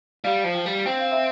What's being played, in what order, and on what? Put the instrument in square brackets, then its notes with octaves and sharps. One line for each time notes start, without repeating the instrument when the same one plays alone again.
[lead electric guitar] G3 [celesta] F5
[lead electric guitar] F3
[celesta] G5
[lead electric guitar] G3
[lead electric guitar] C4 [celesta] G5
[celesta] F5
E5